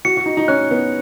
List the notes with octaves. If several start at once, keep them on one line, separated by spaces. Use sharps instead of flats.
F#4 C#7
F#4
D#4
D#4
C#4 F#6
B3